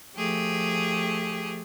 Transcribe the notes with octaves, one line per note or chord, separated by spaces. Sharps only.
F3 A3 G4 G#4